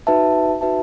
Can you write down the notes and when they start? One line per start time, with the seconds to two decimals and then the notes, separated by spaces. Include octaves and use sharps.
0.07 D#4 F#4 B4 E5 A5
0.61 D#4 F#4 B4 E5 A5